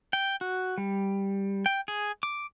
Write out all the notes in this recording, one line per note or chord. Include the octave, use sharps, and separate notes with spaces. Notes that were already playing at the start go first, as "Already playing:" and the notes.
G5
F#4
G3
G5
G#4
D6